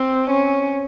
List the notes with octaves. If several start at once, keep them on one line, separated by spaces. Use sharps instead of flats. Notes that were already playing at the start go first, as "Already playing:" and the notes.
Already playing: C4
C#4